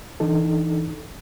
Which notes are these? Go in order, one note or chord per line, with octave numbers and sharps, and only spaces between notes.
E3 D4 D#4 A4